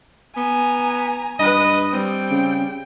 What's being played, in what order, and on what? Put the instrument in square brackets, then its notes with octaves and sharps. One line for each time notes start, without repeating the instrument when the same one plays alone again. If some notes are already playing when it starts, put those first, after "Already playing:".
[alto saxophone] B3 [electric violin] G#5 A#5
[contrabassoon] G2 [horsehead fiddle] B4 [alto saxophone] D#5 [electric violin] D#6
[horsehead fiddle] G3 [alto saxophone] C4 [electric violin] G5
[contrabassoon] C#3